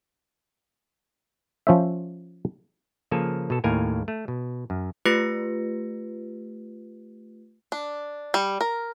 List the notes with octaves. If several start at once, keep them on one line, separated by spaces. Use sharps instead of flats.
F3 C#4 C5 E5
C#3 F3 A#3 A4 G#5
B2 A4
D#2 A2 A#4 F5 G#5
A3
B2
F#2
A3 F4 G4 B4 A#6 C#7
D4
G3
A#4